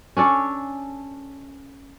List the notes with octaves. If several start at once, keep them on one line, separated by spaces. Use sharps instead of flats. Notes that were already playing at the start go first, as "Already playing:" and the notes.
C#4 D4 A4 C#5